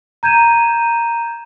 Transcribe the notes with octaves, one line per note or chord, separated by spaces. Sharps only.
A#5 G6 G#6 D#7 E7